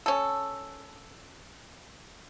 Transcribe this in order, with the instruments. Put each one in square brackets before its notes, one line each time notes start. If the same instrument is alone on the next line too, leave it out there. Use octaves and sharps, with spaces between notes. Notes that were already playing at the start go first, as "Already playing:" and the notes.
[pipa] C#4 A4